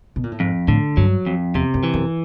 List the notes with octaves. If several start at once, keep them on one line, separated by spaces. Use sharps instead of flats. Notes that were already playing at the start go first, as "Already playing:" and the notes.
B2
A#2
A2
F2 G#2
A2 D3
G2 F#3
F2
E2 C3
F#2
E3
F#2